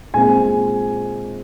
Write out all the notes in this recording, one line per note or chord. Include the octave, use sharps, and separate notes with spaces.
A#2 G#3 C4 G#5